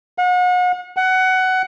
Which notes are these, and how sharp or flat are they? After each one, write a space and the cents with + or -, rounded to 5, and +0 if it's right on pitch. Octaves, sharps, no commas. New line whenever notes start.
F#5 -40
F#5 +15